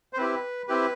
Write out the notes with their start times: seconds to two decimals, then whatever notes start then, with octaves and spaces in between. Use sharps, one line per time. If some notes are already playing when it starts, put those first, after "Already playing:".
0.13 C5
0.17 C4 E4 G4 B4
0.68 C4 E4 G4 B4